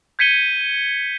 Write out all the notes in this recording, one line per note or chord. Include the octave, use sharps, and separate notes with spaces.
G6 G#6 B6 C#7 D#7 G7